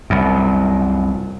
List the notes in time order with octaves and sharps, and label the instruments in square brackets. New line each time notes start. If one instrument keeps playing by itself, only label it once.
[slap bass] C2 F#2